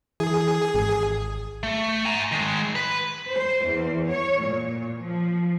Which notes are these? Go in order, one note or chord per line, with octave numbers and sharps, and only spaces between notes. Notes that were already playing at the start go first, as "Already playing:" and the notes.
E3 G#4
G#1
A3
G#5 A#5
D#3 G#3
B4
C5
E2
C#5
A#2
F3